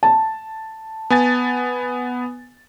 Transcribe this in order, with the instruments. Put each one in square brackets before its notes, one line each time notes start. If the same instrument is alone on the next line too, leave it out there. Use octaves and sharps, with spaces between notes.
[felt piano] A5
[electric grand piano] B3 G#5 A6